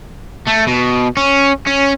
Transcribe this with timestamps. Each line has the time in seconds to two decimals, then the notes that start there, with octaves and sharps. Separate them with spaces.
0.47 A3
0.67 B2
1.17 C#4
1.67 C#4